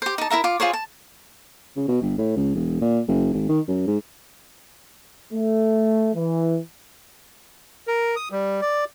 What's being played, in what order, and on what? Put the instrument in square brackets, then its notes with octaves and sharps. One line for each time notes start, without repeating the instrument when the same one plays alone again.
[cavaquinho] G4 C5
D#4 A5
E4 A#4 E5 A#5
F4 D6
F4 G#4 C5 C#5
A5
[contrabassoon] C#3
B2
G1
A2
C#2
E1
A#2
F#1
G#1
D#3
F#2
G#2
[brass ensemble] A3
E3
[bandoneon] A#4
D#6
G3
D5